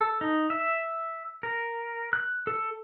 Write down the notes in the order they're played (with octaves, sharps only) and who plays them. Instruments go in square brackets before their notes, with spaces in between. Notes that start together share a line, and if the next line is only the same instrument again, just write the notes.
[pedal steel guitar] A4
D#4
E5
A#4
F#6
A4